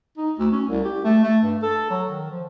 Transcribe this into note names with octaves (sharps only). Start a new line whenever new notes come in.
D#4
D2
C#4
C2
G4
A3
A3
G2
A4
F#3
D#3
F3